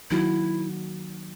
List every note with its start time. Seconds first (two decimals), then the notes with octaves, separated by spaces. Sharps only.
0.11 D#3 F#3 A#3 D#4 E4 F#4